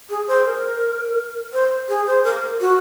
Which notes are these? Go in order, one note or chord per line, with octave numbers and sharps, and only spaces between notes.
G#4
C5
A#4
C5
G#4
C5
A#4
F#4